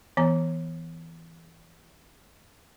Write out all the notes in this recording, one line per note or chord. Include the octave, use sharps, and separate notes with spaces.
E3 B3 A#5